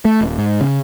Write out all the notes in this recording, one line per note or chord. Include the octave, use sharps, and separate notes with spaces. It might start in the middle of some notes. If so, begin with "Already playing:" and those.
A3
D#1
G#2
C#3